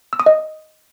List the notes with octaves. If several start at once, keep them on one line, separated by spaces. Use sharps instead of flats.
E6
D#6
D#5